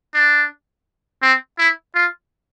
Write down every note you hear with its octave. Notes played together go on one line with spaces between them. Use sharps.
D4
C4
E4
F4